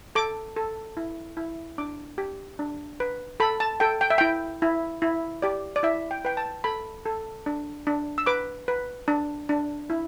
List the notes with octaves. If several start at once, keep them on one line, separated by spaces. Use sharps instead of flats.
A4 D6
A4
E4
E4
D4 D6
G4
D4
B4
A4 B5
A5
A4 G5
G5
E5
E4 G5
E4
E4
G4 D5
D5
E4 E5
G5
B4 G5
A5
A4 B5
A4
D4
D4
E6
B4 D6
B4
D4
D4
E4